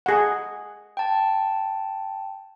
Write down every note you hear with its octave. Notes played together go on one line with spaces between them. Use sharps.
G#4 F#5
G5 A5